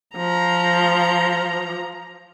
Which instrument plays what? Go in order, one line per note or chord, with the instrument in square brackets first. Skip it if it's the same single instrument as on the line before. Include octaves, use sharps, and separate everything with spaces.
[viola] F3 A#5